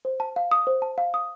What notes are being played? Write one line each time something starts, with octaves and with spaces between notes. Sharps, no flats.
C5
A5
F5
D#6
C5
A5
F5
D#6